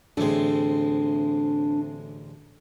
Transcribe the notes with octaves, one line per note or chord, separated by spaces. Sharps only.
A1 D2 G#3 A3 C4 D4